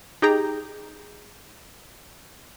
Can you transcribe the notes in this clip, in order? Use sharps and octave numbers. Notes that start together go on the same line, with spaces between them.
D#4 G4 G#4 G5 A#5